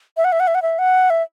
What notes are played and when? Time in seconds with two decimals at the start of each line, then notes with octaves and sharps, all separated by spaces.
0.17 E5
0.24 F#5
0.32 E5
0.40 F#5
0.47 E5
0.55 F#5
0.62 E5
0.79 F#5
1.10 E5